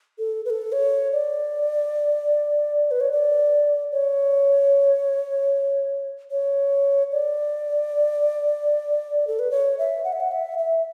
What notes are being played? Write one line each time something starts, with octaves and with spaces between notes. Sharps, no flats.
A4
B4
A4
C#5
D5
B4
C#5
D5
C#5
C#5
D5
A4
B4
C#5
E5
F#5
E5
F#5
E5
E5